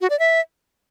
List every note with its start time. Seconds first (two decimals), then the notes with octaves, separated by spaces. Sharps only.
0.01 F#4
0.10 D5
0.19 E5